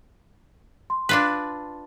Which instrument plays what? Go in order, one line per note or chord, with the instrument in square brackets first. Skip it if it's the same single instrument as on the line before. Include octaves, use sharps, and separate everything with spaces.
[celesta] C6
[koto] D4 F4 B4